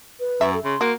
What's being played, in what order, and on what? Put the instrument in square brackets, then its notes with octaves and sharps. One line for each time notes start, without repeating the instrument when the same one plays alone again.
[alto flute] B4
[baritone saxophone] F#2 [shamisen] E5
[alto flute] A4
[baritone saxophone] C#3 [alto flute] C6
[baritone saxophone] A#3 [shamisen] F#4